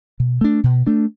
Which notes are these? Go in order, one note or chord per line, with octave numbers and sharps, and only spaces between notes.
B2
A3 D4
B2
A3 D4